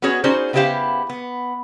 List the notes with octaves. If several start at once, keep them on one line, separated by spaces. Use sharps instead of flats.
B3 C#4 F#4 G#4 C#5
C#4 D#4 F#4 G#4 C5 D5
C#3 B3 E4 G4 C5 F5
B3